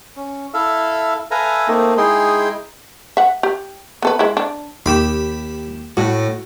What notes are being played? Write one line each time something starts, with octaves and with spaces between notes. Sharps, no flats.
C#4
E4 A4 E5 F5
A4 B4 E5 F5 G#5 A#5
A3 A#3 C4 D#4 A4
G#3 D#4 E4 G#4 G5 C6
E5 F#5
G4
B3 A4 B4
G#3 E4
D4
D#2 G4 B5 E7
A2 F#4